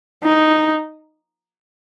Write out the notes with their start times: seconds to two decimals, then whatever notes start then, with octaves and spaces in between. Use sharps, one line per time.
0.23 D#4